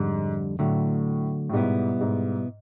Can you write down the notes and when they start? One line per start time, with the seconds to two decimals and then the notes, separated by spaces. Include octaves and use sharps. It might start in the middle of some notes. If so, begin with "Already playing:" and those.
Already playing: F2 G#2 D3 G3
0.59 A2 D3 F#3 A3
1.50 A2
1.53 G#2 B2 G3 B3 E4
2.01 G#2